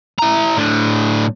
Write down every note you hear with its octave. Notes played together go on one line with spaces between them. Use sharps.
E4 A#5
A2 D4